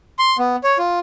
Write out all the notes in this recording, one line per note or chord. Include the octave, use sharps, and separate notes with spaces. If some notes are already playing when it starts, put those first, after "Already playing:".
C6
B3
C#5
F4